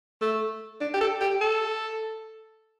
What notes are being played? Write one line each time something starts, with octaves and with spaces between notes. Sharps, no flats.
A3
D4
G4
A4
G4
A4